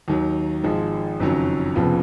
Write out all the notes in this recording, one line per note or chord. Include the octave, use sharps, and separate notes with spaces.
D#2 D#3 F#3
G#1 G#2 F3 G#3
F#1 F2 D#3 F#3 C#4
F1 F2 C#3 F3 B3